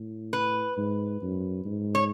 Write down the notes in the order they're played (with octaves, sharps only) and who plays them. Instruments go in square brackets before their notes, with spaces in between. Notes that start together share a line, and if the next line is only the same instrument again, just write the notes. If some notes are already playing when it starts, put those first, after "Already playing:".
Already playing: [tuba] A2
[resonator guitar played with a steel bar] B4
[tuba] G#2
F#2
G#2
[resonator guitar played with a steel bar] C#5